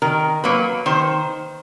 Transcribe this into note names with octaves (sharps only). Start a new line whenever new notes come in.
D#3 A#4
F#3 A#3 B4
D#3 C5